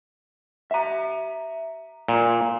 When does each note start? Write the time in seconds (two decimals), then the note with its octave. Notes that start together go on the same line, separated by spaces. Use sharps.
0.71 E5 A#5
2.08 A#2